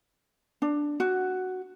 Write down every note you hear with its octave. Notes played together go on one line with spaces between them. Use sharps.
D4
F#4